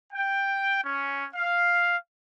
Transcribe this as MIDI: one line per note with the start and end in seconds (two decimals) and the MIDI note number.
0.13 0.83 79
0.83 1.26 61
1.35 1.97 77